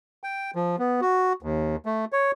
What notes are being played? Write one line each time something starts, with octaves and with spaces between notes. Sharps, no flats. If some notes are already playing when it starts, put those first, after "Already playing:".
G5
F3
B3
F#4
D#2
A3
C#5